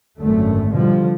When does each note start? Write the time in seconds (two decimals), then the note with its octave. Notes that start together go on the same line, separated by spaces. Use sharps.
0.19 G#1 F#2 D3 A3
0.71 B2 D3 F3 G3